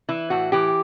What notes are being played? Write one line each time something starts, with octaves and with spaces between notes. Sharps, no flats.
E3 E4
A2 F#4
E3 G4